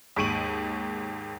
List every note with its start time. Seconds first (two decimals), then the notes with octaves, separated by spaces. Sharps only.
0.16 D#2 G#2 C#6 D7 D#7 F#7